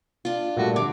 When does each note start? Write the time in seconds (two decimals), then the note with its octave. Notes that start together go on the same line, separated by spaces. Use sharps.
0.25 D4 F4
0.57 A#2 G3 A3 F#4
0.76 D3 D6